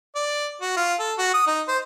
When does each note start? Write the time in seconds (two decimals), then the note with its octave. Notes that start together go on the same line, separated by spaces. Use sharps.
0.15 D5
0.61 F#4
0.77 F4
1.00 A4
1.18 F#4
1.34 D#6
1.47 D#4
1.68 C5